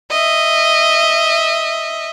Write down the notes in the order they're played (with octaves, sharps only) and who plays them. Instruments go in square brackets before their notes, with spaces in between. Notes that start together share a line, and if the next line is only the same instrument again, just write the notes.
[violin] D#5 E5